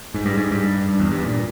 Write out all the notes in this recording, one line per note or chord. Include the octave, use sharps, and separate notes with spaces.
G#2
G2
G#2
G2
G2
E2
G2
A#2